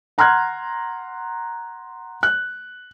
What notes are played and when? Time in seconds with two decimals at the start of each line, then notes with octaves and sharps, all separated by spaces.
0.18 F#5 A#5 C6 F6 F#6 G#6
2.23 F#6